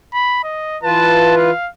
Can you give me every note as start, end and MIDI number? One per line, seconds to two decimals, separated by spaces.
0.14 0.39 83
0.44 0.78 75
0.83 1.51 52
0.83 1.51 65
0.83 1.51 71
0.83 1.35 81
1.37 1.69 77